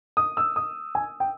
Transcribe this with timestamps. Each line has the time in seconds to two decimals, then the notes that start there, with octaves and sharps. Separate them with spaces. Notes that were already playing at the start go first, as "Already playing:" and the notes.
0.17 D#6
0.37 E6
0.56 D#6
0.95 G#5
1.20 G5